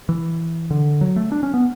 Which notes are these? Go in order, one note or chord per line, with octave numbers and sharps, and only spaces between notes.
E3
D3
F#3
A3
D4
C#4
B3